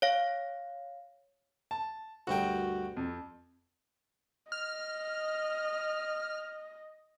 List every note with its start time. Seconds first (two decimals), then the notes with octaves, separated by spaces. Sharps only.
0.02 C#5 F5
1.71 A5
2.27 D2 G2 F#4 A#4 G5
2.97 F2
4.52 D#5 F6